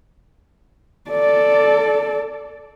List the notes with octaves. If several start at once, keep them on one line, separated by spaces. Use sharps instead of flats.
A4 D5